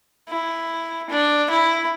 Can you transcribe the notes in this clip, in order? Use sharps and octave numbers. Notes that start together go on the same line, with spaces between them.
E4
D4
E4